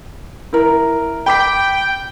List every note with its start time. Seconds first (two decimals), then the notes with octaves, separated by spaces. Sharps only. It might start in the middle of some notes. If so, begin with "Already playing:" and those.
0.53 E4 A#4
1.26 G5 B5 D6 B6